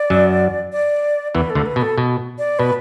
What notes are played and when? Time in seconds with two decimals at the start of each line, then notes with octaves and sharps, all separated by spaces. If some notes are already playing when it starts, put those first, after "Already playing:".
Already playing: D5
0.10 F#2 F#3
0.72 D5
1.35 E2 E3 B4
1.50 A4
1.55 D2 D3
1.66 B4
1.76 B2
1.82 A4
1.98 B2
2.38 D5
2.59 B2 B4